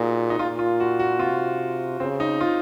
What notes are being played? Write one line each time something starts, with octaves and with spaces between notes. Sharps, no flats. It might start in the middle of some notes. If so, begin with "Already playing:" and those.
Already playing: A#2 D#4 F#4 G#4
D#4
A#2 F4
F4
F#4
F#4
C3 F4
C#3 C4
D#4
F4